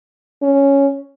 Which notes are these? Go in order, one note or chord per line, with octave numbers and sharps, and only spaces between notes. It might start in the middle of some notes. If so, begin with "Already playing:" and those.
C#4